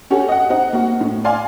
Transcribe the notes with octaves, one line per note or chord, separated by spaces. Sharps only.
C#4 F#4 G4 A4
D#5 F#5
C4 D#4 F#5
A#3 F#4
A2
D5 F5 G#5 C6